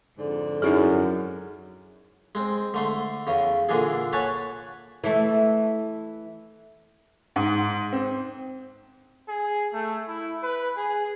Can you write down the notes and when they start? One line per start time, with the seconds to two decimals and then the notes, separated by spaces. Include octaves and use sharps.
0.16 F2 G#2 D3
0.62 F#2 D#4 E4 G#4
2.35 G#3 C4
2.74 D3 A3 C6
3.27 E2 C#3
3.69 A#2 D3 E3 D4 G#4
4.13 B4 C#5 F#5 G#5 A5 C#6
5.04 E3 A3
7.36 G#2
7.92 C4
9.29 G#4
9.73 A3
10.08 E4
10.43 B4
10.77 G#4